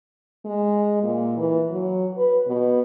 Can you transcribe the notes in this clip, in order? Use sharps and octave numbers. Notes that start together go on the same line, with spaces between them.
G#3
A#2
E3
F#3
B4
B2